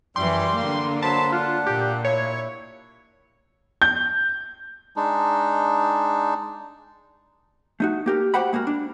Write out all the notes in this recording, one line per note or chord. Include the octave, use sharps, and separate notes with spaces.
F#2 E3 G3 G5 C6 D6
D3 A#3
F#3 C5 A5 B5
D4 F4 F#5
A#2 G4
E4 C#5
G6
G#3 D4 D#4
A3 D#4 F#4
A#3 G4 A#4
F#4 G4 C5 F#5 G5 B5
G#3 A#3 F#4 A#4
D4